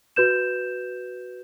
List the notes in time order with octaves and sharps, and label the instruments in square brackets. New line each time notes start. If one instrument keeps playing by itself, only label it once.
[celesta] F#4 B4 G6 E7